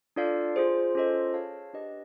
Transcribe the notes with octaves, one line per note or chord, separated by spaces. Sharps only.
D4 F4 A4 D5 F5
F4 G#4 C5
C#4 F4 A4 C5 D#5
G#4 C#5 F5 A5
D4 G4 B4 D#5